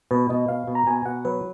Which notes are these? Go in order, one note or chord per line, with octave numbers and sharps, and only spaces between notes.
B2 B4
B2 D#5
B2 F5
B2
A#5
B2 G#5
G#5
B2 F#5
F#3 B4